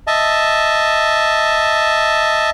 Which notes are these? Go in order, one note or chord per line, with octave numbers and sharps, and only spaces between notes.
D#5 E5 A5